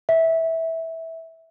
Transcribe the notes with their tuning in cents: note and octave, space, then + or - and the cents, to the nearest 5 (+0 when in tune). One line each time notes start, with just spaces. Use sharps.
E5 -15